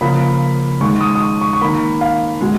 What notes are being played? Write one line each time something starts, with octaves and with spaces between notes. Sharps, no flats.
C#3 F3 A#3 B5
D#3 G#3 C#6
D#6
D#6
C#6
C#6
C#6
D#3 A#3 B5
F5
B2 G#3